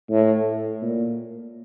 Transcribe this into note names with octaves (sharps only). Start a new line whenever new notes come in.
A2
A#2